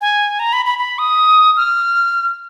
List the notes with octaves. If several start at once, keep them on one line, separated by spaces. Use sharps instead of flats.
G#5
A#5
B5
B5
B5
D#6
F6